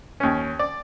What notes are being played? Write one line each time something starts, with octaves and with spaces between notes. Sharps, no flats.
D#2 C#4
D5